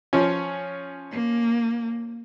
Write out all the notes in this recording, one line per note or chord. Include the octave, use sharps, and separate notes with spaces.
F3 C#4
A#3